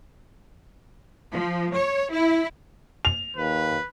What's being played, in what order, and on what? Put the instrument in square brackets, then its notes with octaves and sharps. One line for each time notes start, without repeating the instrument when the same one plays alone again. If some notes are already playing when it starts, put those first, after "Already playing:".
[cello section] F3
C#5
E4
[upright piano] F7
[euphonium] D#2 [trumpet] B4